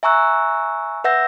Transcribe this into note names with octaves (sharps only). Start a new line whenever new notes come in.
E5 G#5 A#5 C#6 E6 F#6
B4 E5 F#5 E6 G6 A#6